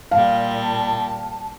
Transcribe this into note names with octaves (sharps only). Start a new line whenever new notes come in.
A#2 G3 F5 A5